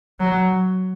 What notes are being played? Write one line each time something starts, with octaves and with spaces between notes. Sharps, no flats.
F#3